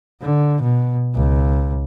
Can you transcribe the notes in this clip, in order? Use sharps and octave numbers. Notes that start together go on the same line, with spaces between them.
D3
B2
C#2